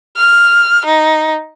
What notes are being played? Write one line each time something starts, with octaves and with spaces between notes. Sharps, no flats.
F6
D#4